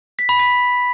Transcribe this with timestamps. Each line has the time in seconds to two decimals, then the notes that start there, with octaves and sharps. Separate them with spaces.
0.19 B6
0.29 B5
0.39 B6